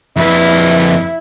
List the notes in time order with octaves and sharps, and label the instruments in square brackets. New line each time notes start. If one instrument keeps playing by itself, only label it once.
[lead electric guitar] F2 B4 [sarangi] E4